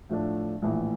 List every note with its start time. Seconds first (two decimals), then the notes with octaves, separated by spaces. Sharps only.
0.09 A2 F3 A3 D4
0.62 A#1 A2 E3